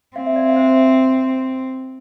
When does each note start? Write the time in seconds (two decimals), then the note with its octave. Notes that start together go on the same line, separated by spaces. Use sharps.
0.16 C4 F5
0.26 E5
0.36 D5 F5
0.50 F5
0.56 C5 E5